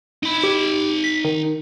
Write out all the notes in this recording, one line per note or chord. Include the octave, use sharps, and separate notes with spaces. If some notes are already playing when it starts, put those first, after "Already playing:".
D#4 B5
G4
B6
D#3